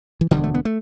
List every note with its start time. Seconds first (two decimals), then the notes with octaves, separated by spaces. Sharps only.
0.21 E3
0.31 E1 D2 D3 G3
0.44 A3
0.54 B3
0.65 A3